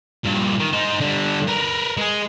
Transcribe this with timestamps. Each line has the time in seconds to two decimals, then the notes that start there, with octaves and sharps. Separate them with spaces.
0.24 G2 A#2
0.59 D#3
0.73 D#4 C5
1.01 D3 G3
1.48 A#4 B4
1.97 G#3 G#4